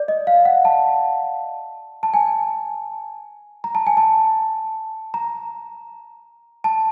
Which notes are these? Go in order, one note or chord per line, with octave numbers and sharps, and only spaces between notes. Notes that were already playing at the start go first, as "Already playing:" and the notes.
Already playing: D5
D#5
F5
F#5
A5
A5
G#5
A#5
A5
G#5
A5
A#5
A5